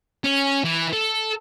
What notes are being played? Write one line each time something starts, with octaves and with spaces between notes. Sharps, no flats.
C#4
E3
A4